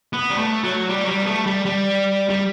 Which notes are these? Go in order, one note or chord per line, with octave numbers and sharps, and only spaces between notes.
B3
G3
A3
F#3
G3
F#3
G3
B3
A3
G3
G3
G3